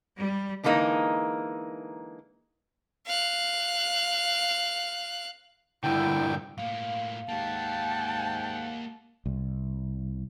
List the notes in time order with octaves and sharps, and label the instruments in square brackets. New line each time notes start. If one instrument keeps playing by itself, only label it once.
[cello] G3
[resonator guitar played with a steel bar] D3 E3 G#3 A#3 D#4
[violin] F5 F#6
[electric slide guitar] G2 A#2 D3 [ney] E4 [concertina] G5
[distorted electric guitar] A2 A#3 [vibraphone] F5
[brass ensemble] G#2 F#5 G5 [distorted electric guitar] A#3 G4 [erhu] A5
[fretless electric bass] C2